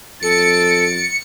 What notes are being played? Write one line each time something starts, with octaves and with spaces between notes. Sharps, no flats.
F2 A4 A6 C#7 D7